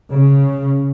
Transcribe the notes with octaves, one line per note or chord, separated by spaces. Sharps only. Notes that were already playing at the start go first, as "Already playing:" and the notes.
C#3